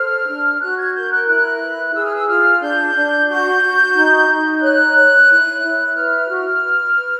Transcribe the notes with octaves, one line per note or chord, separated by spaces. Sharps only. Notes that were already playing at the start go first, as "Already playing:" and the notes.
Already playing: A4 C5 F6
D4
F#4 F#6
G#6
A#4 G6
F#6
E4 F#6
B4
G#4 E6
F6
E6
F4 F6
D4 G6
D4
F#4 G6
F#4
D#4
D#4
C#5 F#6
C#5
E4
E4
B4 F6
F#4
B4
B4